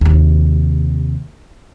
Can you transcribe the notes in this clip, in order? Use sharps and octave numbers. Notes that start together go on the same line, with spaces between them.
D#2 C3